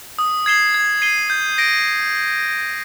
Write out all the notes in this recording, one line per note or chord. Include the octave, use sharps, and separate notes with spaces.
D#6
G#6 C7 E7 G7
G#6
C7 D#7 G7
G6
A#6 D7